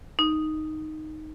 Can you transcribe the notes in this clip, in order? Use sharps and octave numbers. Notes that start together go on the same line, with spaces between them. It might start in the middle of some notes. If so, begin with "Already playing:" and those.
D#4